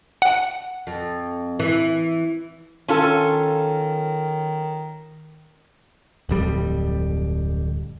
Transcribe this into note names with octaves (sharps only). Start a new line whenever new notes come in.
F#5
F2
E3
D#3 C#4 F4 A4
D1 F2 G3